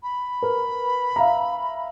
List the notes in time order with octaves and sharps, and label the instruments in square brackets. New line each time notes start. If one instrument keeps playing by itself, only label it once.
[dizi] B5
[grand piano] A#4 B4
E5 F5 A#5